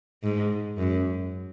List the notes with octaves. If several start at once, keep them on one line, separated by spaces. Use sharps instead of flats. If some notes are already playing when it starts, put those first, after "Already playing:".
G#2
F#2